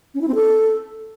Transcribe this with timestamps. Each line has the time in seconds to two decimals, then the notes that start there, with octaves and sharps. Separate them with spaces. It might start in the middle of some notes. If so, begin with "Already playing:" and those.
0.14 C#4
0.21 E4
0.28 C4
0.35 A4